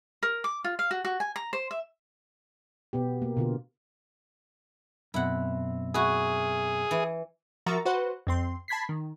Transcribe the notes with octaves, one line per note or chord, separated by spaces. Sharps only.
A#4
D6
F4
F5
F#4
F#4
G#5
A#5
C5
E5
B2 B3 G4
A#3
B2 D3 F4
F#2 B2 C4 E4 F#5
E4 F#4 G#4
E3
F3 F#4 A#4 E5 A#5 A6
F#4 B4 C5 F#5
F2 C4 C6
A5 B5 G#6 B6 C7
D#3